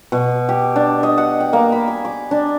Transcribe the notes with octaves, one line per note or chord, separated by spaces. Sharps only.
B2
G4
D4
D#5
F#5
G5
A#3
B5
G#5
D6
D4